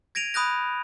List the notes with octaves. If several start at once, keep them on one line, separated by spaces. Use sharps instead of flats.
G#6 A#6 D7 D#7 F7
B5 D#6 F#6 G6 A#6